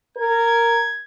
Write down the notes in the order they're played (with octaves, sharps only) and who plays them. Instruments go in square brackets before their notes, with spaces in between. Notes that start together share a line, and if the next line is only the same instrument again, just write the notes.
[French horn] A#4 [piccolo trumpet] G#6